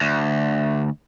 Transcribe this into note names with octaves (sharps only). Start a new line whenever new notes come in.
D2